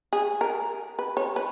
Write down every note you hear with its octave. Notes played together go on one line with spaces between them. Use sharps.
G#4
A#4
B4
C#5
B4